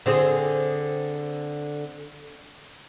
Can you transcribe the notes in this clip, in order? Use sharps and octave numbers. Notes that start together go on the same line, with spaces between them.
D3 C4 G#4